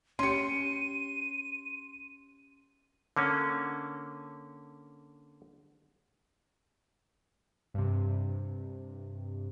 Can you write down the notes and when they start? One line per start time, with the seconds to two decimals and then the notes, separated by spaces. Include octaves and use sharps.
0.19 C#4 G4 C6 C#7 D#7
3.17 D3 A#3 C#4
7.74 G2 C3